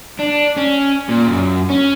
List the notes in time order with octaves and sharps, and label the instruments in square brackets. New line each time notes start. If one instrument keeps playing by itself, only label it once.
[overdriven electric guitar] D4
C#4
A#2
F#2
C#4